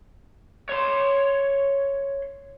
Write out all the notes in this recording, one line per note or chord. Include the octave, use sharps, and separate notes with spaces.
C#5 C6